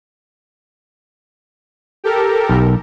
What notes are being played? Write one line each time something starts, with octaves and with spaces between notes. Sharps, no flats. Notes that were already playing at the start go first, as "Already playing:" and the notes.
G4 A4 A#4
B1